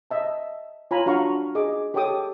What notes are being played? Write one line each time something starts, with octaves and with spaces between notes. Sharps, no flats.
D#5 E5 A5
F4 C#5 G#5 A#5 B5
D4 F#4 F5 A#5 C#6
G#4 D#5 D6
G4 A4 C#5 G5 D6 D#6